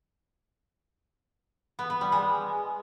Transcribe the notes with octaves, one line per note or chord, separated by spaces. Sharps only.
B3
B3
G3
G#3